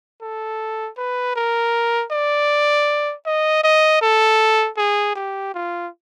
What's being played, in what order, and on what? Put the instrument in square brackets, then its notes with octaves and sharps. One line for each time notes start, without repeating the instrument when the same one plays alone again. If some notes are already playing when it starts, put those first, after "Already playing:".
[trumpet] A4
B4
A#4
D5
D#5
D#5
A4
G#4
G4
F4